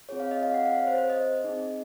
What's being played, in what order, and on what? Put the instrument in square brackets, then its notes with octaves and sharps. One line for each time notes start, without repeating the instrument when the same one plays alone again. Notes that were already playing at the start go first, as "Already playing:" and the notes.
[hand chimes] C4 F4 G#4 C#5
F5
D#5
F5
F#5
F5
C#5
C5
C5
D#5
C4 D#4 G#4